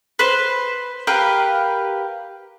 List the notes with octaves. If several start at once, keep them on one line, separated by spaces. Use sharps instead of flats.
B4 C5
G4 A#4 B4 F5